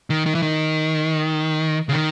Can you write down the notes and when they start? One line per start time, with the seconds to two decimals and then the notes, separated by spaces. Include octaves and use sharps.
0.10 D#3
0.26 D#3
0.35 E3
0.42 D#3
1.89 C#3
1.92 D#3